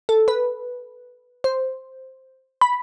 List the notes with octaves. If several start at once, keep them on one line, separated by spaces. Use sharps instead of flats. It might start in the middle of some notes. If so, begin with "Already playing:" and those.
A4
B4
C5
B5